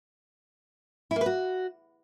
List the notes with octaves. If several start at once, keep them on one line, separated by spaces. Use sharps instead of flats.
E4
A#3
B4
F#4